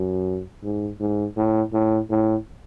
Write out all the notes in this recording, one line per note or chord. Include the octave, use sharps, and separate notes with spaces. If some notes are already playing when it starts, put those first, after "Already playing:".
Already playing: F#2
G#2
G#2
A2
A2
A2